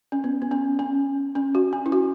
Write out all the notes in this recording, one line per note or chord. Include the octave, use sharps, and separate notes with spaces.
C#4
B3
B3
C#4
C#4
C#4
F#4
C#4
E4
F#4